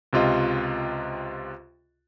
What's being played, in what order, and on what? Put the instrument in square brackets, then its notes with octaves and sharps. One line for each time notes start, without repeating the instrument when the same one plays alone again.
[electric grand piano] C#2 C3 F4 D#5